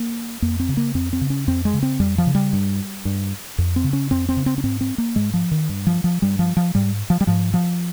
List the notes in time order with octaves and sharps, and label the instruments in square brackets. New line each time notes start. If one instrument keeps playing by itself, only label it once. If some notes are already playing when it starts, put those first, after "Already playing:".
Already playing: [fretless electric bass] A#3
F2 A#3
C4
C#3
A#3
F2 C4
C4
C#3
C#4
F2 C4
G#3
C#3
C4
F2 G3
F3
C#3
G3
G2
G2
F2
C4
C#3
C#4
F2 C4
C4
C#3
C4
C#4
G#2 C4
C4
A#3
G#2 G#3
F3
D#3
G2
F3
F3
G2 G3
F3
F3
G#2 G3
F3
G3
G#2 F3
F3